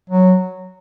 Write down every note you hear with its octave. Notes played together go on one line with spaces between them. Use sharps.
F#3